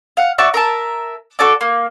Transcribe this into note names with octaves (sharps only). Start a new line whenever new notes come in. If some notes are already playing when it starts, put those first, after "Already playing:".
F5 F#5
F#4 D5 E5 C#6
A#4 E5 A5
F#4 A4 D5 D6
A#3